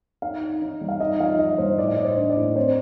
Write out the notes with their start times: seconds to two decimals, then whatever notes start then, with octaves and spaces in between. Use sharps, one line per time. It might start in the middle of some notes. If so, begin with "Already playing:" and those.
0.22 D#4 F5
0.41 D#4
0.62 D#4
0.81 G3
0.89 F5
1.00 D#4 D#5
1.20 F3 F5
1.39 D#4 D#5
1.58 G2 C5
1.78 A2 D5
1.87 D#5
1.96 A2 D5
2.05 C5
2.17 D4
2.30 D5
2.36 A2
2.56 C4 C5